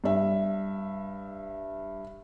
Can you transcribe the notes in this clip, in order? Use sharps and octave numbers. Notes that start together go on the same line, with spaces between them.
G2 E5